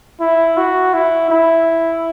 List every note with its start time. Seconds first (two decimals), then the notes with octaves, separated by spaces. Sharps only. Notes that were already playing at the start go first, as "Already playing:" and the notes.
0.20 E4
0.57 F#4
0.94 E4
1.30 E4